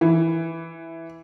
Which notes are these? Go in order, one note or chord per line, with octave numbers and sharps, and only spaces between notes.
E3